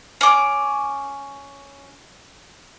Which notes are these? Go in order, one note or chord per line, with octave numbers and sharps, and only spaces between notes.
C#4 D6